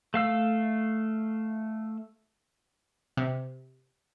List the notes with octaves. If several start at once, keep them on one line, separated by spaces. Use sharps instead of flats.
A3 F5 E6
C3